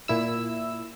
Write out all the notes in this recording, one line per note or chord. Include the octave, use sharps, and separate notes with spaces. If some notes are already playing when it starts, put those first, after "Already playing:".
A#2 E4 E6